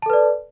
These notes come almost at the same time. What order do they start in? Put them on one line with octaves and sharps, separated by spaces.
A5 A4 B4 D5